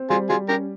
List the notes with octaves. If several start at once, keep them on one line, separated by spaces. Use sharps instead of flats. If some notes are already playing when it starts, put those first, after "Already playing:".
Already playing: C4
G3 F4 G#4
G3 F4 G#4
C#4 G4 A#4